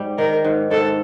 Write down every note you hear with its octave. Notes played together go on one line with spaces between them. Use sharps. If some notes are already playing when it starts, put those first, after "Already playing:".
Already playing: G#2 G3
D#3 A#4
G#2
G#2 A4